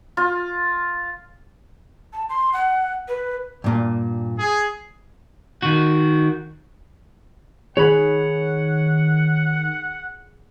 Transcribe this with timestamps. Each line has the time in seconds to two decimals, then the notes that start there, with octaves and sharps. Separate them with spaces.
0.17 F4
2.13 A5
2.29 C6
2.53 F#5
3.08 B4
3.64 G2 A#2
4.39 G#4
5.62 D#3 F#4
7.77 D#3 G#4 C#5 F#5 B5